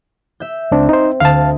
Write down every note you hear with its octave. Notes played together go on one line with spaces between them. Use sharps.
E5 G6
C#2 C4 D4
D#4 C5
D2 F5 A5